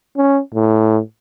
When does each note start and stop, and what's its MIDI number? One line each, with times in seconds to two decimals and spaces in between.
0.16 0.40 61
0.54 1.00 45